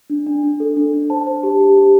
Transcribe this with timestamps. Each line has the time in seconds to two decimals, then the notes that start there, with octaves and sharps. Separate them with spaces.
0.10 D4
0.26 D4
0.43 D4
0.60 A4
0.77 D4
0.93 D4
1.10 C5 A5
1.27 C5
1.43 G4
1.60 G4
1.77 G4